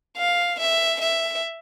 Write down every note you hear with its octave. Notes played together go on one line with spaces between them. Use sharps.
F5
E5
E5